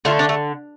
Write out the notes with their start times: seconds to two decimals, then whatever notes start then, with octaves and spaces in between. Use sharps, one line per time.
0.05 D3 A3 F4
0.19 D4
0.29 A3